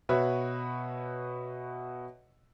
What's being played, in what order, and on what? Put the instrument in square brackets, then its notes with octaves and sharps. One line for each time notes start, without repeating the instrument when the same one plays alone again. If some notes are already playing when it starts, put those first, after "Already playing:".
[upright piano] B2 F#4 B4 C#5 E5